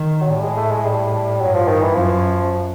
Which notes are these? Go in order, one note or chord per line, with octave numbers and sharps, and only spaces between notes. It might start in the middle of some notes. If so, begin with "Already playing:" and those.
Already playing: D#3
F#3
A2 G3
G#3
A3
G#3
G3
G2 F#3
F3
D#3
E3
F#2 F3